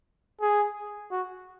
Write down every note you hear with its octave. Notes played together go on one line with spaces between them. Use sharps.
G#4
F#4